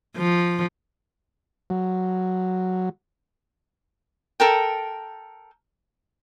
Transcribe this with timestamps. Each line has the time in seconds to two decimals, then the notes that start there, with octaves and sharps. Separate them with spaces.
0.17 F3
1.70 F#3
4.40 A4 A#4 G5